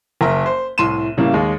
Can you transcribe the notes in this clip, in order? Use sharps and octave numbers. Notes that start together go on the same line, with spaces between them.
F#1 A#4 E5
C5
C2 A2 C6 D#7 E7
A2 C#3 G3 A#3
D#2 G#3